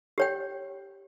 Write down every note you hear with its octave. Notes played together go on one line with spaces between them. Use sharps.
G4 C#5 G5